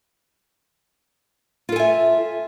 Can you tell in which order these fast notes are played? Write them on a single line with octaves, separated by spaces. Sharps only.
F4 A4 G#5 E5